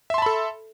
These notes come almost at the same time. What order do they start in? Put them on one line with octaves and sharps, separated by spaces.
E5 C6 A5 B5 A4